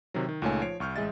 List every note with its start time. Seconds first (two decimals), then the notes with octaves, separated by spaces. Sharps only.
0.14 C3 D#3 F#3
0.29 D#3
0.42 C#2 A#2 A3 D#4 C#5 G#5
0.62 F3 C#5 C7 D7
0.80 C2 C#6 F6 G6
0.96 A1 G#3 G#4 D#5 E5 A6